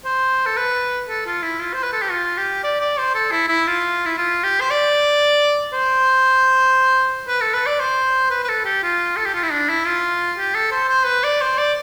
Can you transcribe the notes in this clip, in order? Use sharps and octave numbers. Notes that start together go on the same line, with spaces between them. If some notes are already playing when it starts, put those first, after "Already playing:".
C5
A4
B4
A4
F4
E4
F4
C5
B4
A4
G4
F4
G4
D5
D5
C5
A4
E4
E4
F4
E4
F4
G4
C5
D5
C5
B4
A4
B4
D5
C5
B4
B4
A4
G4
F4
A4
G4
F4
E4
D4
E4
F4
G4
A4
C5
C5
B4
D5
C5
D5